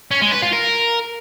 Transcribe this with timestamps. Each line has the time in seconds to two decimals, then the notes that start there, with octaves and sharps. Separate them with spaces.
0.11 C#4
0.22 G#3
0.32 B4
0.42 F4
0.53 A#4